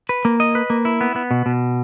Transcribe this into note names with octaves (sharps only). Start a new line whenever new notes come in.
B4
A#3
D#5
B4
A#3
E4
B3
B3
B2
B2